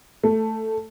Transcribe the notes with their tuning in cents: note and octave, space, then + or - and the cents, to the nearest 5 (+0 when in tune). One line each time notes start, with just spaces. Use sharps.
A3 +5